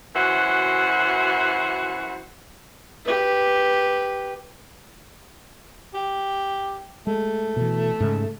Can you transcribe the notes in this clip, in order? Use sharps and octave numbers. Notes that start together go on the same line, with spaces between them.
F#2 E3 F#4 C5
G4 B4
G4
G#3 A3
B2 E3
G#2 C#3